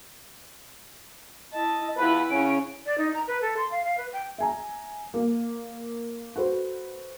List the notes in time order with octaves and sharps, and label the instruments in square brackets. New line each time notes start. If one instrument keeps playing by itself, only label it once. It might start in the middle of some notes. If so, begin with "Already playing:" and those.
[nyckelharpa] E4 A5 [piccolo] D#5
[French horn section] E2 F4 B4 [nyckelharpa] E4 F#5 [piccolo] B5
[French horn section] C#3 C#4 [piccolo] D7
[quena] D5
D#4
A#5
B4
A4
C6
F5
F5
B4
G5
[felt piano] E5 G#5 A#5
A#3
F#4 A4 B4 C5